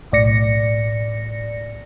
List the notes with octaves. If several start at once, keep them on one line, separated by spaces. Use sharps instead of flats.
B1 A2 D5 A#6 C#7